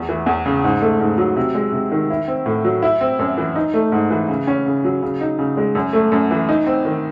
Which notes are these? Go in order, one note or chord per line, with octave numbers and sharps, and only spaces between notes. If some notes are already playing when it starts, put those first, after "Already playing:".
Already playing: E2
E3
E2
C#3
G#2
A3
G#2
F#3
C3
G#3
C3
D#3
E4
C4
A2
F#3
E4
C4
F#2
E3
D#4
A3
G#2
E3
C#3
C#4
C#3
F#3
C#3
D#4
C#3
G#3
F#2
A3
F#2
E3
D#4
C4
D#3